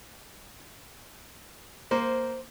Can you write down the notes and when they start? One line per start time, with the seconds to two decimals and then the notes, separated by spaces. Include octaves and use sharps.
1.91 A#3 C5